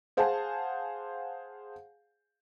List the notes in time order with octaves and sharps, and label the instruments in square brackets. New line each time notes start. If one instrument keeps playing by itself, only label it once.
[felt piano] G#4 C5 F5 F#5 G#5 A5